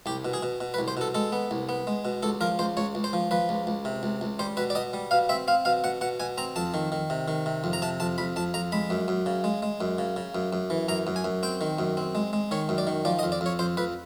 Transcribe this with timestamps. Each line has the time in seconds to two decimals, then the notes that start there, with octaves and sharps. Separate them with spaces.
0.06 C2 G4
0.25 B2
0.33 G#4
0.43 B2
0.61 B2
0.74 B4
0.79 C2
0.88 C5
0.97 B2 A4
1.15 G#3 A4
1.32 B3
1.51 C2
1.69 B3
1.87 G#3
2.05 B2
2.23 C#2 A4
2.41 F3 A#4
2.59 C#2 C5
2.77 C#2 C#5
2.95 C#2
3.04 C5
3.13 F3
3.31 F3 B4
3.49 C#2
3.67 C#2
3.85 C3
4.03 C#2
4.21 C#2
4.39 G3 C5
4.57 B2 B4
4.70 D5
4.75 B2 D#5
4.94 G3
5.11 B2 F5
5.29 C4 E5
5.48 C4 F5
5.65 B2 F5
5.84 B2 F#5
6.01 B2 F#5
6.20 B2 G#5
6.38 C4 A#5
6.56 F2 A5
6.74 D#3
6.92 D#3
7.10 C3
7.28 D#3
7.46 C3
7.64 F2
7.73 A#5
7.82 C3 A5
8.00 F2 A5
8.18 F2 B5
8.36 F2 A5
8.54 F2 A#5
8.72 G#3 B5
8.90 F#2
9.08 F#2
9.26 C#3
9.44 G#3
9.63 G#3
9.81 F#2
9.99 C#3
10.16 C#3
10.35 F#2
10.53 F#2
10.70 E3
10.88 F#2 A#5
11.07 F#2
11.16 G#5
11.24 F#2
11.43 C4 G5
11.61 D#3
11.79 F#2
11.97 C4
12.15 G#3
12.33 G#3
12.51 D#3 C#5
12.69 F#2
12.78 D5
12.87 D#3
13.05 F3 D5
13.19 D#5
13.23 F2
13.32 D5
13.41 F2 C#5
13.59 F2 C5
13.77 F2 B4